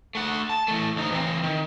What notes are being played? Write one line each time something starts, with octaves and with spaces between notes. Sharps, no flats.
A3 F#5
A5
E3 A3
D2 D#4
E3 C4
D#3